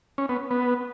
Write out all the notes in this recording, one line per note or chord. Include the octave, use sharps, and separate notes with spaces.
C#4
B3
B3